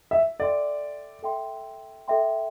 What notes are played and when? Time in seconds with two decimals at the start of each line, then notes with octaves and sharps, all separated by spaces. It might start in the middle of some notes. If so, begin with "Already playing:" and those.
0.11 E5
0.39 A4 D5 E5 G5 C6
1.23 A4 E5 G5 C6
2.08 A4 E5 G5 C6